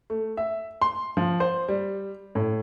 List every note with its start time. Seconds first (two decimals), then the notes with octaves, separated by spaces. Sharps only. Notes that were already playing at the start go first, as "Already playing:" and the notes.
0.10 A3
0.37 E5
0.82 C6
1.17 F3
1.40 C5
1.69 G3
2.35 A2